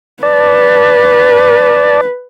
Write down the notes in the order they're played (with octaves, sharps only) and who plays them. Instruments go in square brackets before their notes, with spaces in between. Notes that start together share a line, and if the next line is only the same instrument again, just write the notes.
[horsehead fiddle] B4 [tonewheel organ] D5 A5